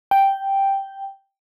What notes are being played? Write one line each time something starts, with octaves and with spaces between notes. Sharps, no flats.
G5